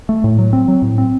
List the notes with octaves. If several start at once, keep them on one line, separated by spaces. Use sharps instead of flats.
A3
A2
F#3
C4
F#3
A2
C4